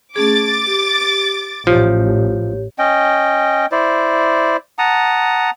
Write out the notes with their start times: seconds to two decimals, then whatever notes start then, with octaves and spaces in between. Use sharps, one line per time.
0.16 A3 C#4 G#4 D6 A6
0.67 G4
1.67 A1 F3 G4 C#5
2.79 C#4 D#5 G5
3.72 E4 C5 D5
4.79 F#5 A5 A#5 D#6